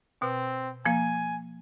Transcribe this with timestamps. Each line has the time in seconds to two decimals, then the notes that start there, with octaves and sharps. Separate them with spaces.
0.22 B2 C4
0.85 F3 A#3 G#5